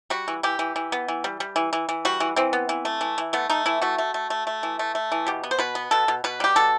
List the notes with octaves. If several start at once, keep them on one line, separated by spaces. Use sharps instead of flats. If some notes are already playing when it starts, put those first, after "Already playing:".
G3 F#4
E3
E3 G4
E3
E3
B3
E3
G3
G3
E3
E3
E3
G3 F#4
E3
E3 C4
B3
E3
A3
E3
E3
A3 B3
A3 D#4
E3 E4
A3 F#4
A3
A3
A3
A3
E3
A3
A3
E3
B2 G4
B3
C5
B2 B4
B3
B2 A4
B2
B2 B4
G3 G4
B2 A4